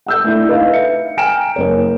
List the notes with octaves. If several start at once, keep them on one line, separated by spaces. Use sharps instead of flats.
F#5 E6 G6
A3 D4 E4
D#4 B4 F5
E5 C#7
G5 G#5 A#5 F6 D7 E7
F#1 C#5